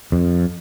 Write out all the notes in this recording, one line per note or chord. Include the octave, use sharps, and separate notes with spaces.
F2